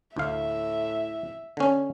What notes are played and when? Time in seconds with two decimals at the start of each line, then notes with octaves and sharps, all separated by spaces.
0.17 D2 A2 E5 F5
1.57 D3 C#4